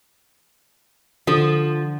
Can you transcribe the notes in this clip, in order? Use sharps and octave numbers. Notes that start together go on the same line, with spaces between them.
D3 F3